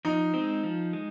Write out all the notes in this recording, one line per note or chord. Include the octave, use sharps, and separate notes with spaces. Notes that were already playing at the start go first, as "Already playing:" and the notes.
F3 D#4
G#3 C4
F3
G#3